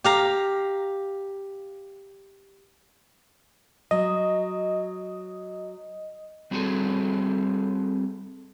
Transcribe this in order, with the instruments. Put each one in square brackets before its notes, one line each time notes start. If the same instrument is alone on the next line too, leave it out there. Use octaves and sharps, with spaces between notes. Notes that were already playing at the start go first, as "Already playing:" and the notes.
[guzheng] G4 F5 A#5
[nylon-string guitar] F#3 [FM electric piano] D#5
[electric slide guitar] G3 C4 F#4 G#4 A4